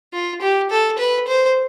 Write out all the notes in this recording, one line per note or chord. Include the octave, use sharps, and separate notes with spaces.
F4
G4
A4
B4
C5